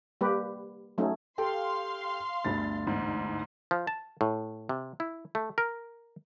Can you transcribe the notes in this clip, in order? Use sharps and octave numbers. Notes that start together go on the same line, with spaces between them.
G3 A#3 G4 B4
F#3 A3 C#4 D#4
G4 A4 F5 G5 C6
G1 D2 B5 A6
E2 G#2
F3
A5
A2
C3
E4
A3
A#4